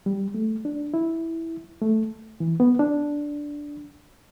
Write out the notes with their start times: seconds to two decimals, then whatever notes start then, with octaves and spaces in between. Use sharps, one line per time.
0.06 G3
0.34 A3
0.65 D4
0.94 E4
1.81 A3
2.40 E3
2.60 B3
2.79 D4